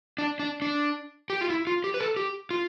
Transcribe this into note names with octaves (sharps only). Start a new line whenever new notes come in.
D4
D4
D4
G4
F4
E4
F4
G4
B4
A4
G4
F4